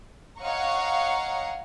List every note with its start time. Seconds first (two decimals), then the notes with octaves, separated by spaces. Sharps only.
0.39 C#5 D#5 F5 F#5 A#5 C#6